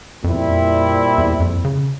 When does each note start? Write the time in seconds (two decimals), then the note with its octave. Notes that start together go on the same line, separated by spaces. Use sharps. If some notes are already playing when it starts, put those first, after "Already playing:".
0.23 F2 A#2 G3 C4 E4
0.32 E2
0.39 F2
1.18 E2
1.40 F2
1.64 C#3